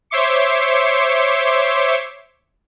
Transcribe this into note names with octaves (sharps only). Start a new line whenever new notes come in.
C5 C#5 E5 C6 D6 C#7